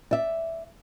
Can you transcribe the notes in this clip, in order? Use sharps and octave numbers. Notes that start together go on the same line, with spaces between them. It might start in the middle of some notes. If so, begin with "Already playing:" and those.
D5 E5